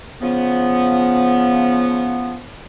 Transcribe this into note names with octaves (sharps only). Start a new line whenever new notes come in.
C#3 F3 B3